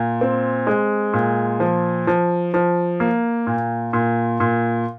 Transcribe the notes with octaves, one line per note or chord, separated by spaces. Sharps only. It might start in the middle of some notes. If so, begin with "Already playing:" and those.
Already playing: A#2
C4
G#3
A#2
F3
F3
F3
A#3
A#2
A#2
A#2